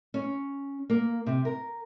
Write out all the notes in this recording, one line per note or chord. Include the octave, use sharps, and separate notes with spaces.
C#4
A#3
C3
A#4